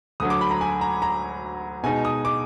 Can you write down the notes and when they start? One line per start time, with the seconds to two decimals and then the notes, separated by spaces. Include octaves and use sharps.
0.20 D2 D3 F#3 D#6
0.30 D6
0.41 B5
0.51 A#5
0.61 G#5
0.81 A#5
1.02 A#5
1.84 B2 G#3 D#4 G#5
2.05 D#6
2.25 D6